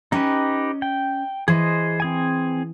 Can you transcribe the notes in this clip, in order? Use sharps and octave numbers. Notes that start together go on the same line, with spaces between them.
C#4 D#4 G4 B4 D#5
G5
E3 G#4 C5 D#5
C4 G#4 G#5